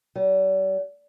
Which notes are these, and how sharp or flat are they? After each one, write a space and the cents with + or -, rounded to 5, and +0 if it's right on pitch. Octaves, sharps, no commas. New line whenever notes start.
G3 -45